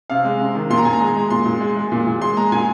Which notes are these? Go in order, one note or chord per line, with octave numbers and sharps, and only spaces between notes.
C3 F5
G#3
C3
D#3
A#2 C6
A#5
A#2 G#5
A#5
G#3
G#3
A#2 C6
A#2
G#3
G#3
A#2
A#2
G#3 C6
G#3 A#5
A#2 G#5